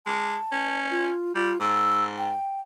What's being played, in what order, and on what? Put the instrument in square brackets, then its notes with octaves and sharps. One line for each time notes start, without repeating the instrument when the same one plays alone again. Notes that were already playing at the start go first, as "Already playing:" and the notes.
[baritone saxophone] G#3 [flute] A5
[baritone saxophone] C#4
[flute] F4
[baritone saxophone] G3 [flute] F4
[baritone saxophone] G#2 [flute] E6
[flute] G5